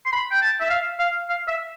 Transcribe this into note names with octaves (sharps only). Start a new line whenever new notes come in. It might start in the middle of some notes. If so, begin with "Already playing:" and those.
C6
B5
G5
A5
E5
F5
F5
F5
E5